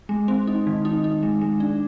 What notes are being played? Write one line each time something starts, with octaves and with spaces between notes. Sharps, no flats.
G#3
C4
D#4
D#3
D#4
D#4
G#3
G#3
D4